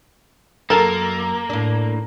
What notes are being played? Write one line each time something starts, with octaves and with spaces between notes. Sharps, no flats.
F#2 A#3 A4 A#4 A#5
A2 D4